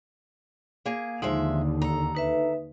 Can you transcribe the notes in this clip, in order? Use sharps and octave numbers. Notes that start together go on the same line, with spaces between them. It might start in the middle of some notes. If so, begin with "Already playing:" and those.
A#3 G#4
D#2 D3 F3 G#3 D#4 E5
A4 A#5
D#4 B4 E5